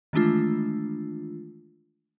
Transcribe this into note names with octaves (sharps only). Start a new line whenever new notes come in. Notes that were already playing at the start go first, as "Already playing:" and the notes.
D#3 E3 G#3 A3 D4 F4